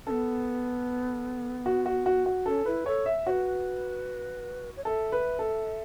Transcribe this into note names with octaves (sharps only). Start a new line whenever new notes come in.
B3 C#4 A4
F#4
F#4
F#4
F#4
C#4 A4
E4 B4
A4 C#5
E5
F#4 B4 C#5
C#5
A4 E5
B4
A4